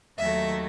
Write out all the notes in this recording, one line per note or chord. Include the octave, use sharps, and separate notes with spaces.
D#2 D#3 F#3 A3 E5